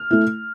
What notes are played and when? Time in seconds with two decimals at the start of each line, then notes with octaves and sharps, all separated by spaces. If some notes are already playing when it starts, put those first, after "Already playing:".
Already playing: F6
0.11 A3 E4